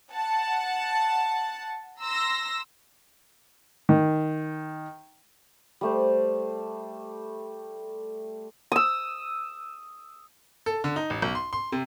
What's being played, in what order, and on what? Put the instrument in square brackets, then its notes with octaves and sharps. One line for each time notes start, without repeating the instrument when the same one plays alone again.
[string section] F#5 A5
A#5 C6 E6 A#6
[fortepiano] D#3
[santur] G3 A3 C5
D#6 E6
[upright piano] A4
D3
D#4
A1
B1
C6
C6
C3